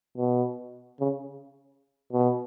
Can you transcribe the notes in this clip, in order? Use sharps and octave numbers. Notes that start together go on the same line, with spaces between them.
B2
C#3
B2